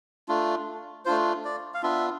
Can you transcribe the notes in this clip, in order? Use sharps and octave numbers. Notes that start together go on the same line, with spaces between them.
A3 D4 F4
A3 D4 F4 C5
D5
F5
B3 D4 F4 E5